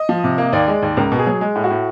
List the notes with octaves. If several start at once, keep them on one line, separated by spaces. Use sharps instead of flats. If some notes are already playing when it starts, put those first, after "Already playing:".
Already playing: D#5
F3
C3
A#3
D#2 D5
G#3
D#2
C#2 A#4
B2
G#4
F#3
G#3
A2
F#4
A2